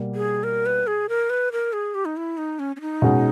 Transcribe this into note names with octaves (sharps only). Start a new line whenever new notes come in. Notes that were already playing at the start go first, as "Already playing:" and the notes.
Already playing: B2 G3 A#3
G#4
A#4
B4
G#4
A#4
B4
A#4
G#4
G4
D#4
E4
D#4
C#4
C#4
D#4
B2 G#3 C#4